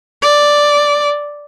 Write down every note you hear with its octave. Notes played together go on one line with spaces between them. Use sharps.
D5